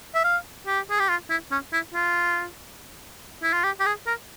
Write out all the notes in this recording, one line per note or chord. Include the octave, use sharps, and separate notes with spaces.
E5
F5
G4
G#4
G4
F4
E4
C#4
E4
F4
E4
F4
G4
G4
G#4
A#4